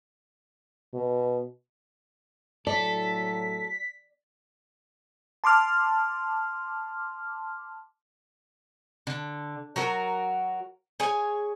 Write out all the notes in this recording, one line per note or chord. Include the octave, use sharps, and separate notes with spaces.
B2
A2 F#3 A4 D5 B6
A5 C6 D6 F6
D3
F#3 F#4 A#4
G#4 C#5 G#5